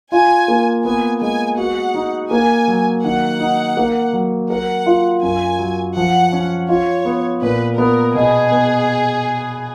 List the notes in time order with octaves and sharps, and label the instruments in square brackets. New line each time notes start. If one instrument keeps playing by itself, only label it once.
[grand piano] F4 [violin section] G#5
[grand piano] A#3
[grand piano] B3 [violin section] G#5
[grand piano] G#3 [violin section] G#5
[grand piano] F#4 [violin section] F#5
[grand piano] D#4
[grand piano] A#3 [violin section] G#5
[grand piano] F#3
[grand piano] D#3 [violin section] F#5
[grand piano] D#4
A#3
F#3
[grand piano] A#4 [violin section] F#5
[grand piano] F4
[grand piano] F#2 [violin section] G#5
[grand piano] F#3
[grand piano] F3 [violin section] F#5
[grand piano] C#4
[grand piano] F4 [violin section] C#5
[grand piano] B3
[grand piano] A#2 [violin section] B4
[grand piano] B3 [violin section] A#4
[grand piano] B2 [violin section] G#4
[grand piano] B3